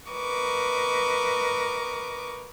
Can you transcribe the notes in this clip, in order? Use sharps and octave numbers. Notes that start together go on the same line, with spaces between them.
A#4 B4 D#5 C#6 D6